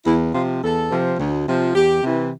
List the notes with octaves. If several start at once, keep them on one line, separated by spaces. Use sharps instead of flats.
E2 E4
C3 F3 F4
E2 A4
C3 F3
D2
C3 F3
E2 G4
C3 E3